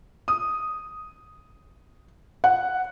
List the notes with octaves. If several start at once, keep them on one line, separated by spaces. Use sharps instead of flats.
D#6
F#5